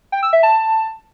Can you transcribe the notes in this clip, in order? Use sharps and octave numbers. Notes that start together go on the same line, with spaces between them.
G5
E6
E5
A5